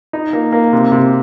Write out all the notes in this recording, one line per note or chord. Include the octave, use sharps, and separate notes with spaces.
D#4
A#3
A#3
C3
C3